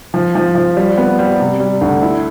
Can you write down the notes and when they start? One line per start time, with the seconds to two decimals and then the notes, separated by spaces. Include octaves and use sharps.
0.14 F3
0.35 F3
0.55 F3
0.77 G3
0.98 B3
1.19 G3
1.40 C3
1.60 G3
1.81 D2
2.02 E4